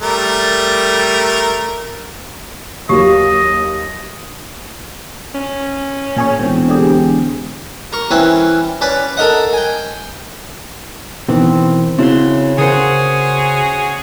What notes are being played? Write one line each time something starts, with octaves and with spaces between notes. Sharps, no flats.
G3 A3 A#4
D#2 F#3 A#3 G4 D#5
C#4
A#2 G#4 C#5
E1 A#2 C4
D3 G4 G#4
A#4 C#6
E3 C4 C#4 B4
C#4 B4 D5 B5
A4 A#4 D#5 F#5
G5 G#5
B2 D#3 E3 C4
C#3 C4 E4 F#4 C6
C#3 C#4 F#4 G#4 A#4 C5 F#5 G#5